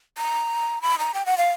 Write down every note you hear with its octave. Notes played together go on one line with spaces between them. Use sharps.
A#5
B5
A#5
G5
F#5
F5